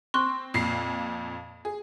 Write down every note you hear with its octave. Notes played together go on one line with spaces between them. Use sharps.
C4 C6 C#6 F#6
F2 A#2 C7
G#4